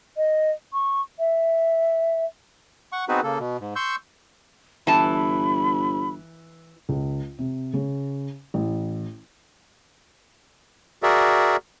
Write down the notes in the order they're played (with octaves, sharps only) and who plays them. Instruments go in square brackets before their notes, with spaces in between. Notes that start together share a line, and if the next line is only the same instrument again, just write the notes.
[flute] D#5
C#6
E5
[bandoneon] F#5 C#6
B3 C4 D#4 F#4 G#4 B4
C#3 A#3 A4
B2
G#2
C6 C#6 E6 G6
[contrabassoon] G1 [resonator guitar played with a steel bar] E3 A5 [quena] B5
[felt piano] C#2
C3
C#3
A1
[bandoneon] F#4 G#4 A#4 D5 E5